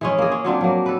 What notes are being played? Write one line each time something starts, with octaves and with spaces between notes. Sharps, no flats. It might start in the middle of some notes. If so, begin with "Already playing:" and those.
E3 G#3 C#4
A#3 G#4
C#4
F#3 C4 D4 F4
F#3 A#3
A4 B4